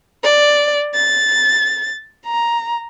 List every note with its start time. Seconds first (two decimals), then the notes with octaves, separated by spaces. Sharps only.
0.24 D5
0.94 A6
2.26 A#5